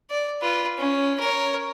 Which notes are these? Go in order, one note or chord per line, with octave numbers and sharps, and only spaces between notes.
D5
F4 B4
C#4
A#4 C#5